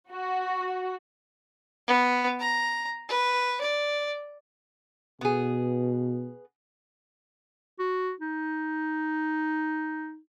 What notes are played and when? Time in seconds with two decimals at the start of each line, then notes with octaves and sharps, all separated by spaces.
0.10 F#4
1.88 B3
2.40 A#5
3.09 B4
3.61 D5
5.21 B2 B3 G#4
7.79 F#4
8.21 D#4